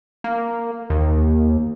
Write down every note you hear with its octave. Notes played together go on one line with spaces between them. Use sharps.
A#3
D#2